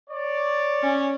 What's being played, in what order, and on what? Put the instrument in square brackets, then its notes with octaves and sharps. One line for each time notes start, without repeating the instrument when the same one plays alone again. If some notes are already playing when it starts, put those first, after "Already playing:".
[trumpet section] C#5 D5
[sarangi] C#4